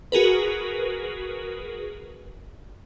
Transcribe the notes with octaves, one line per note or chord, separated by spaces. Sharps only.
F#4 G#4 A#4 B4